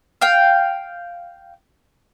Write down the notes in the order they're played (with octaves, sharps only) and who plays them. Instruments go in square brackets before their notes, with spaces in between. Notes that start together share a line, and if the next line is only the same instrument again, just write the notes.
[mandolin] F5 G5